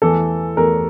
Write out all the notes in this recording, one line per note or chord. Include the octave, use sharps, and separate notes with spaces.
E2 E3 A3 A4
E2 E3 A3 A#4